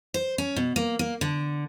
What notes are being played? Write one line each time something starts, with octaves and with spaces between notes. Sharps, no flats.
C5
C#4
B2
A#3
A#3
D3